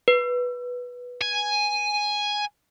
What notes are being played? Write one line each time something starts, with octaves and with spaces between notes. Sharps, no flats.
B4
G#5